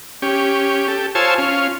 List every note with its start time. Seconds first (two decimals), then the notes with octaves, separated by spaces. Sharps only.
0.22 C#4 G4
0.88 G4 A4
1.15 F4 C5 C#5 G#5 A5 E6
1.38 C#4 F4